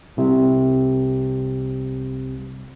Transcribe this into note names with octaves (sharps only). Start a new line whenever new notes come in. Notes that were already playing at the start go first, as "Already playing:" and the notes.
C2 C3